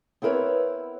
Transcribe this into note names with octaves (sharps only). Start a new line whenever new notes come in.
B3 C4 E4 A#4 B4 C#5